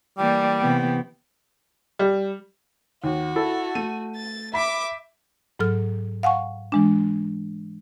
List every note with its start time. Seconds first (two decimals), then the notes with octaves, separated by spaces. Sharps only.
0.18 E3 G3 A#3 D5 G5
0.60 C3 E3 B3
1.99 G3
3.04 D#2 F#4
3.36 E4 A4
3.75 A3 D#7
4.16 A6
4.53 E5 B5 D6 B6
5.59 G#2 F#3 A4 F6
6.23 F5 F#5 G#5 C#6
6.72 E3 G#3 D4